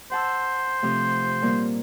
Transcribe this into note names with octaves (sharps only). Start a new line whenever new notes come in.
C5 F#5 A5 E6
C3 F3 A3
A#2 G3 A#3